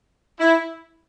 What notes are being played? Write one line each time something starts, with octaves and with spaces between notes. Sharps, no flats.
E4